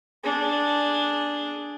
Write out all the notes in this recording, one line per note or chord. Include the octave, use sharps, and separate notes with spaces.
D4 G#4